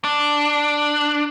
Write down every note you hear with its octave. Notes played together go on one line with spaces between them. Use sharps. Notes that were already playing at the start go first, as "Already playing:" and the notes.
D4